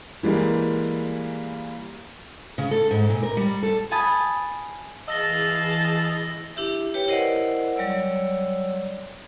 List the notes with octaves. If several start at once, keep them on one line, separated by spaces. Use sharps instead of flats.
E3 G3 G#3 A#3
C#3
A4
G#2
A#2
A#4
G3
A4
G#5 A5 B5 D#6 A6
E3 G#4 D#5 F5 A5 E6 A#6 G7
D4 E4 G4 E5
G4 B4 C#5 G5
E4 A#4 C5 D5 D#5 F#5
F#3 G3 C#5 D5 E6